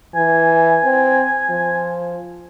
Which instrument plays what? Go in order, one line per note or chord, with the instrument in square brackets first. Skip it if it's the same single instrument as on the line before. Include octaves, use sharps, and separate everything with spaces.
[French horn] E3 [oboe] G#5
[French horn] C4
F3